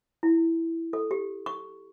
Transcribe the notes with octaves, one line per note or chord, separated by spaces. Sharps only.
E4
A4
G4
C#6